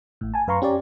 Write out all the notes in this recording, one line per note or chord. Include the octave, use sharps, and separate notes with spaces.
A1 A2
G#5 A5
F#2 B4 F5 A#5 C6 C#6
C#4 G4 C#5 D5